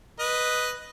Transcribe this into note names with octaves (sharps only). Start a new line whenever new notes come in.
B4 D#5